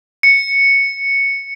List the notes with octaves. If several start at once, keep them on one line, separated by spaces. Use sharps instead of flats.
C#7